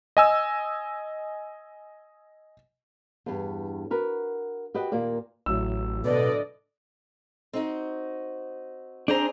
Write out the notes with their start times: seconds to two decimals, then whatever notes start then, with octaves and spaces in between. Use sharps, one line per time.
0.17 D#5 G#5 E6
3.26 E2 G2
3.91 F#4 A#4 B4
4.74 F#4 G4 B4 D#5 F#5
4.92 D#2 A#2 A#3 D5
5.46 A1 A2 F#3 E6
6.04 B2 D3 B4 D5 D#5
7.53 C4 D#4 F#4
9.08 C4 D4 G#4 C5 A#5